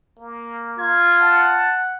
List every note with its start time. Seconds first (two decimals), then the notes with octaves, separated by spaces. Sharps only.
0.19 A#3
0.79 F4 G#6
1.21 F#5 A5